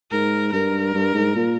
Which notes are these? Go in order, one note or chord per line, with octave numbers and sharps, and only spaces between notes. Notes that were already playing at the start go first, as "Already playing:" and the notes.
G#2 A#4
G2 A#4
G2
G#2
A#2